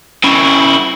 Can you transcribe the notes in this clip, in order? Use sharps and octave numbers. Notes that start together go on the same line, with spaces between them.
C#3 E4